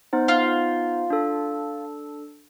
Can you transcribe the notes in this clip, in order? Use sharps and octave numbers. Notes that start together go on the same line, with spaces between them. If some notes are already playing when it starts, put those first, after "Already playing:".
B3 D#4 C5
F4
D4 A4